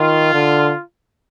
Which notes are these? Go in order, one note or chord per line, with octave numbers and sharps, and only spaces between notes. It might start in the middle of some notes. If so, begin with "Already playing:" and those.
Already playing: D#3 F4
D3